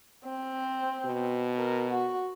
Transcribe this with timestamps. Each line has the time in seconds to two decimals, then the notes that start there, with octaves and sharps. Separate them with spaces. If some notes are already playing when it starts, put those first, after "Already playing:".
0.25 C4
1.05 B2
1.57 A#4
1.91 F#4